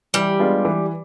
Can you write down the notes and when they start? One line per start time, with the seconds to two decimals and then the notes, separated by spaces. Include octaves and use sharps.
0.14 E3 G3
0.39 G#3 B3 D4 F4
0.65 E3